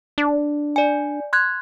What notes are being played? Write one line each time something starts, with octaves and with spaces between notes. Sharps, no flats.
D4
D5 G#5
C6 F#6 G#6